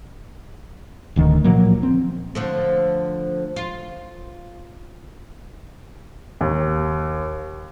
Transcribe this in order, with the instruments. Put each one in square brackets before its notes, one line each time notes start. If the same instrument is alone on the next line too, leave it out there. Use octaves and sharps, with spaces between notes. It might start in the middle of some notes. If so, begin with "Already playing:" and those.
[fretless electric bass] D1 D2 D#3
A#2 F3 F#3 A#3
C4
[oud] D3 F3 A3
F4
[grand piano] D#2